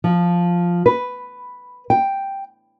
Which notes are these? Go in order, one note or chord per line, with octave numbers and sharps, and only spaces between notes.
F3
B4
G5